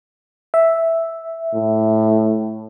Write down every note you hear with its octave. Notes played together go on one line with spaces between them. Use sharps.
E5
A2